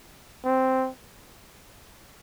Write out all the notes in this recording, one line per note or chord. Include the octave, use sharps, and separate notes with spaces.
C4